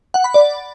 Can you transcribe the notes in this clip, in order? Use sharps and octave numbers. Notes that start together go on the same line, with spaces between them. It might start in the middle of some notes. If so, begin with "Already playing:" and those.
F#5
B5
D5